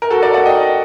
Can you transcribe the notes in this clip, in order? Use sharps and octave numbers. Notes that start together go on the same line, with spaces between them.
A#4
F#4 A4
A#4 D5
D5 F#5
D#5 G5